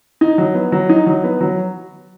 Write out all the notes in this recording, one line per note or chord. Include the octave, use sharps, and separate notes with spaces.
D#4
F#3
B3
F#3
D#4
F#3
B3
F#3